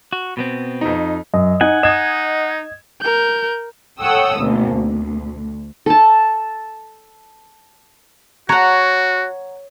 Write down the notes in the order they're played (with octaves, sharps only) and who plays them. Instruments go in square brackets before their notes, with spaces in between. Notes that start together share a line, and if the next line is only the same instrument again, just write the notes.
[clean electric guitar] F#4
B2 B3 C4
[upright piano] F2 D#4
[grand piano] F#2 [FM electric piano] D#5
[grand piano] D#4 [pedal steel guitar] F#5 G#5
[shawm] D#4 [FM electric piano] D#5 G#6 [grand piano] E7
[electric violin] A#4 G6
[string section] A4 C#5 F#5 G5 D#6 E6
G#1 D2 B2 A#3
D2
[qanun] A4 A5
[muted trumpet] F#4 [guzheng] C#5 [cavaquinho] F#5 A#5